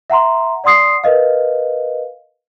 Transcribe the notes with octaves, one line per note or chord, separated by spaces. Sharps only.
E5 F#5 A#5 C6
D5 F#5 C6 D#6 C7
A#4 B4 D#5 F5